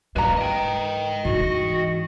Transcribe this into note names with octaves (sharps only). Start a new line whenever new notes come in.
G#2 G#3 A#3 B4 A#5
D#5 G5
G#2 E3 F#4